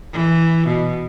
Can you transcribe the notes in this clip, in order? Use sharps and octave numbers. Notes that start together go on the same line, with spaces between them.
E3
B2